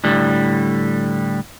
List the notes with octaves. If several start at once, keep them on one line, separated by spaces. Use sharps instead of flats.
A2 D3 G3